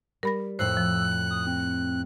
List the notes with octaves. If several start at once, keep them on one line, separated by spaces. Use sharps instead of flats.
G3 A#4 B5 A#6
F2 A2 C5 E6 F#6
F3
D#6
C4